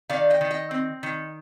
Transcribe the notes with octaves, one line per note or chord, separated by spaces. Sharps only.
D#3 D5 F5
D#5 G5
D#3
D#5 G5
C4
D#3